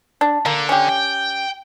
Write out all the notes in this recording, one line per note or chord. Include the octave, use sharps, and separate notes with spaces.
D4
D3 A#3
C#4 G4
G5